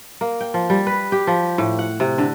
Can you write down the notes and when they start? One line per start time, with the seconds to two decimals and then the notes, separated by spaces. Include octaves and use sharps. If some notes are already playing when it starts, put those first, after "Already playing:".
0.21 A#3
0.41 G5
0.54 F3
0.70 G3
0.87 B4
1.12 G4
1.27 F3
1.58 A2
1.79 F#5
2.00 C3
2.18 D3